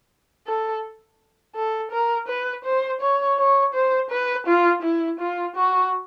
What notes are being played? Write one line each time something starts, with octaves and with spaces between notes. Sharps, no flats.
A4
A4
A#4
B4
C5
C#5
C#5
C5
B4
F4
E4
F4
F#4